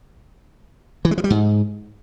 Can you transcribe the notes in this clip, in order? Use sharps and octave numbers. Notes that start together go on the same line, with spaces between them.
E3
G#3
F3
G3
G#2